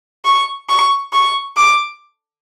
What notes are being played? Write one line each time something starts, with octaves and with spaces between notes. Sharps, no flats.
C#6
C#6
C#6
D6